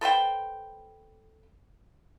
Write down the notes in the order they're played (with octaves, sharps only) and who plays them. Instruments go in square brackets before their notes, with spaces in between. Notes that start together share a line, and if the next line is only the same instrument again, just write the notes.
[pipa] A4 B4 C5 G5